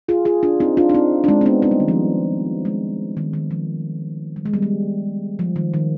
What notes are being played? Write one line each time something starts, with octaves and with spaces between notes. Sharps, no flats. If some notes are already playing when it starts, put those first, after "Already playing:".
F4 G#4
F4 G#4
D4 F4
C4 D#4
D4 F4
D4
C4 D#4
D4
G#3 C4
C4
B3 D4
C4 D#4
G3
D#3
F3
G#3
D#3
D#3
F3
G3
G#3
G3 B3
G#3
F3
D#3
D#3